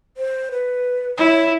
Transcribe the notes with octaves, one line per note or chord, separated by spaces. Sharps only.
C5
B4
E4 C#5